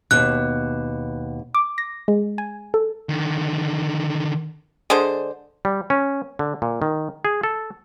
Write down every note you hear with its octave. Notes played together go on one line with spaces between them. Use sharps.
D#2 B2 F#6
D6
A#6
G#3
G#5
A4
D3 D#3
D3 G#3 G#4 C5
G3
C#4
D3
A#2
D#3
G#4
A4